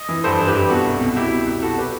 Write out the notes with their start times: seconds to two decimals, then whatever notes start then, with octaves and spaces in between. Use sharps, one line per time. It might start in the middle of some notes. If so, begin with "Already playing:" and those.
Already playing: D#5
0.09 E3
0.24 G2 A4 C5
0.39 E3
0.47 G4 B4
0.55 G2
0.70 B2 F#4 A4
0.85 C2
1.01 B2
1.13 F#4
1.16 C2 E4 G4
1.31 B2
1.47 C2
1.62 B2 F#4 A4
1.78 G4 B4